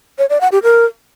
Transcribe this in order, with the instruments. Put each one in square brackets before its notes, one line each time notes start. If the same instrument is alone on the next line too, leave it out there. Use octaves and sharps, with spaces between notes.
[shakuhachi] C#5
D5
F#5
G4
A#4